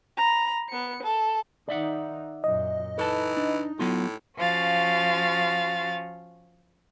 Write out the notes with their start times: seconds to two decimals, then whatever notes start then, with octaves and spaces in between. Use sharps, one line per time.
0.17 A#5 B5
0.69 B3 C#7
1.03 A4
1.69 D#3 D#4 D5 E5 F#5
2.44 F#2 A#2 D#5
2.98 E3 D#4 A4 B4 A5
3.37 D4
3.79 A2 F#3 B3 F4
4.38 F3 C#4 F#4 F5 A6